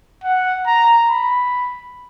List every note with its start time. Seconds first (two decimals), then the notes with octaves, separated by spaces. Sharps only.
0.24 F#5
0.67 A#5
1.09 B5